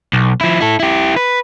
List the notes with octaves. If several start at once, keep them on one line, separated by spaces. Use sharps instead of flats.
B1
F3 E4
E4 A4
E4 G4
B4